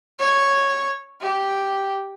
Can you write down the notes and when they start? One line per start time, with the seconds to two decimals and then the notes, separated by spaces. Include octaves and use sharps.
0.19 C#5
1.21 G4